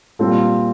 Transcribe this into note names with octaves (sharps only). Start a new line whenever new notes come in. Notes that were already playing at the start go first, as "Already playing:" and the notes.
A#2 G3 C4 F4 A4